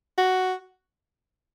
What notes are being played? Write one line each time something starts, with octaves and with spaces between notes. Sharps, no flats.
F#4